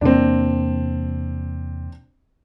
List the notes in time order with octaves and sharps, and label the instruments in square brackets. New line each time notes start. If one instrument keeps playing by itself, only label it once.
[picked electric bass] E2 C3 A#3 [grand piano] C4 D4